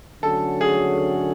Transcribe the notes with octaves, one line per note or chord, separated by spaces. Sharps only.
D3 F#3 A3 C#4 F#4 A4
G#4